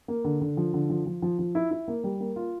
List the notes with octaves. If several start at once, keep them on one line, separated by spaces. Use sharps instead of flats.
A#3
D3
D3
F3
D3
F3
F3
F3
F3
E4
E4
A#3
G3
A#3
F4